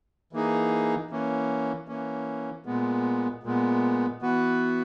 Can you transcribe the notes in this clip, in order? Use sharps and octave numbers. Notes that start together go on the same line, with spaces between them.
E3 A#3 D#4 G#4
E3 A#3 C#4
E3 A#3 C#4
A#2 G#3 B3
A#2 G#3 B3
E3 B3 F#4 B4